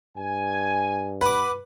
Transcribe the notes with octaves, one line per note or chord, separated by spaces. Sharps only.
G2 G#5
B4 F#5 D6